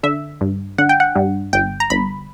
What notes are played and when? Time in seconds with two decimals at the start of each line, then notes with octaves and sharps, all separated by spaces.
0.03 D3 E5
0.41 G2
0.78 D3 F#5
0.89 G5
1.00 F#5
1.16 G2
1.53 G1 G5
1.80 A#5
1.90 G1 B5